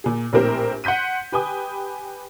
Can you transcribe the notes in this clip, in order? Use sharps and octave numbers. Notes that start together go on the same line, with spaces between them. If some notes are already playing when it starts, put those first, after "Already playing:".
A#2 G#4
A#1 A2 C4 G4 A#4 C5
F#5 C6 G6 B6 D#7
G4 B4 G5 G#5 D#6